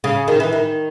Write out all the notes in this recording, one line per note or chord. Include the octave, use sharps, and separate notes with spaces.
C#3
D#3
E3
D#3